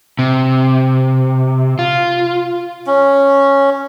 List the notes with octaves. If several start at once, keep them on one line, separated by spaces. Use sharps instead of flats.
C3
F4
C#4